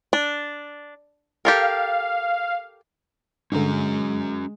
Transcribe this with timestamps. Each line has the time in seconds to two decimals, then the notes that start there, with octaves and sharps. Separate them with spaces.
0.13 D4
1.45 G4 A4 A#4 F5
3.52 G2 D3 G#3 C#4 F#4 A#5